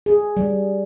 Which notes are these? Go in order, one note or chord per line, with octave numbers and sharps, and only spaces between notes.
G#4
G3